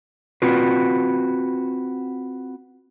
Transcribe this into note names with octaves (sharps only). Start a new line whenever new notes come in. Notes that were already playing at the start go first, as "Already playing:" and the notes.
C4 F4 F#4 B4